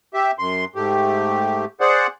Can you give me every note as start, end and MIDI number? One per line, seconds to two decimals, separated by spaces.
0.14 0.31 67
0.14 0.31 76
0.39 0.65 42
0.39 0.65 84
0.75 1.65 44
0.75 1.65 57
0.75 1.65 67
1.80 2.07 68
1.80 2.07 72
1.80 2.07 74
1.80 2.07 78